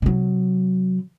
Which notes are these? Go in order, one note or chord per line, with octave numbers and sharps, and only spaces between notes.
C3 F#3